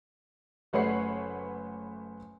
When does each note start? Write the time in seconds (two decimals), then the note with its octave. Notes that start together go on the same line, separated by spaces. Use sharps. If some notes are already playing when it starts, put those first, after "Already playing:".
0.73 F#1 A3 B4 C#5 F#5 C7